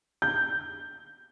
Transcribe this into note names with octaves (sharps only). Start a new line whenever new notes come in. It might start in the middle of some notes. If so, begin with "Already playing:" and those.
G6